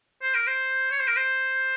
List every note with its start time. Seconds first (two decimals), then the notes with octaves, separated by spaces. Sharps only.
0.22 C5
0.35 A#4
0.47 C5
0.91 C#5
1.00 C5
1.07 A#4
1.16 C5